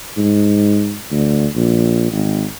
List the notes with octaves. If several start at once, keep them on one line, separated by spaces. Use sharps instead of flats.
G#2
D2
A#1
G#1